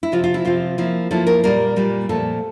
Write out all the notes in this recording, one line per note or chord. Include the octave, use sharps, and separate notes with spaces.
E4
C3 F3 C4 F4
F4
E4
C3 F3 C4 F4
F3 A#3 E4
F3 A#3 E4 A4
A#4
A#2 G3 A#3 A#4
A#2 G3 A#3
A#2 F3 A3 C4 A4